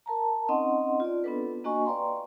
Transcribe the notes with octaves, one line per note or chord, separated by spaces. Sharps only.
A#4 A5 A#5
C4 C#4 D#4 D#5 F#5 C6
F4 D5
B3 C4 D4 A4 B4
A#3 D4 F#4 D#5 G#5 C#6
B4 D5 F5 G5 A#5 C6